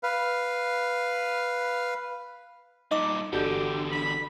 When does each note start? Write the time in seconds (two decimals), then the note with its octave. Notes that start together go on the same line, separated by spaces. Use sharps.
0.03 B4 F5
2.91 G2 A#2 D#4 D#5 D6
3.33 G1 E2 D3 D4 F#4 G4 A4
3.91 B5